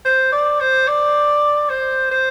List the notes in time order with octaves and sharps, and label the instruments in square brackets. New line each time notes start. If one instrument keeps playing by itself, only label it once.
[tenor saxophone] C5
D5
C5
D5
C5
C5